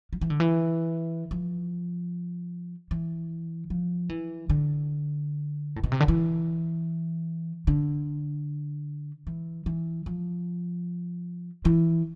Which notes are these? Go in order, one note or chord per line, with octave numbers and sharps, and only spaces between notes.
F3
E3
D3
E3
F3
E3
F3
E3
D3
A2
B2
C3
D3
E3
D3
E3
E3
F3
E3